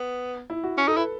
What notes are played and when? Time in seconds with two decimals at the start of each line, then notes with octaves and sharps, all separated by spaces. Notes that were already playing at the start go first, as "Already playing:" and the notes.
Already playing: B3
0.50 E4
0.63 F#4
0.78 C#4
0.88 D#4 A4
0.97 E4 B4